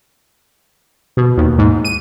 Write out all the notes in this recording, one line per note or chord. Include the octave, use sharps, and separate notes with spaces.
B2
D#2
G#2
D#7